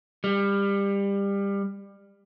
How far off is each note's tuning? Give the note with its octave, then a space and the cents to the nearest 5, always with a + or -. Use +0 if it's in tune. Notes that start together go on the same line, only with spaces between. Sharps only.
G3 +25